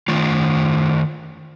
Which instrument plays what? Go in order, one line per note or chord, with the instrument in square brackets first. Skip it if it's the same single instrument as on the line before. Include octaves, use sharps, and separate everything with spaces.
[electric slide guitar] D#3 A3 F4